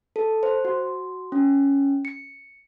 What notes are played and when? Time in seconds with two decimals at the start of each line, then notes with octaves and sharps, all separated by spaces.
0.16 A4
0.43 C5
0.65 F#4
1.32 C#4
2.05 C#7